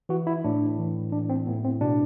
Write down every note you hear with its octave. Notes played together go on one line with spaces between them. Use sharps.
E3 F#4
E4
A2 D4
E3
A2 D4
C4
A2 B3
C4
B2 D4